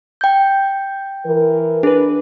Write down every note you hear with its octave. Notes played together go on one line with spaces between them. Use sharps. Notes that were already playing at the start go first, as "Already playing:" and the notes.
G5 G6
E3 A#4
D4 G#4 B4